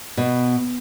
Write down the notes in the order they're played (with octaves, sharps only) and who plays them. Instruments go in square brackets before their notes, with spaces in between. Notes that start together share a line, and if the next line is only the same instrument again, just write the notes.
[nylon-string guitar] B2